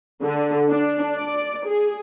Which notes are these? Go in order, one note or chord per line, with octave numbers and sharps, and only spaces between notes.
D3
D4
D5
G#4